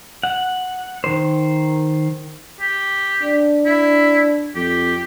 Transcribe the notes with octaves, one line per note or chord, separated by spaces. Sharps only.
F#5
D#3 C5
G4
D4
E4
F2 G4